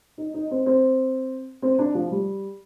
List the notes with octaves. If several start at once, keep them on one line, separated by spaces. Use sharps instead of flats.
D#4
D#4
C4
C4
C4
D4
F3
G3